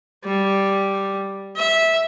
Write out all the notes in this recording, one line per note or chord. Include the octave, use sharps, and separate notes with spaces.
G3
E5